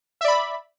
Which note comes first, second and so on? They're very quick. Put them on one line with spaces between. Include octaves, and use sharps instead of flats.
E5 D5 B5